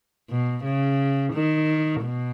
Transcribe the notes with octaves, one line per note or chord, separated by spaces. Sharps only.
B2
C#3
D#3
B2